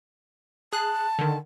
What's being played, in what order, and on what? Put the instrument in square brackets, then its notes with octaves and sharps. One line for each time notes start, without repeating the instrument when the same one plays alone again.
[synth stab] G#4 F#6 [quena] A5
[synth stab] D3 D#3